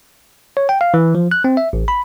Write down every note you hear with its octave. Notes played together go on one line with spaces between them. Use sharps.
C#5
G5
F5
E3
F3
F#6
C4
E5
A1
B5